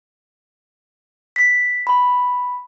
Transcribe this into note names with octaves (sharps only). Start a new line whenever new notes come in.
B6
B5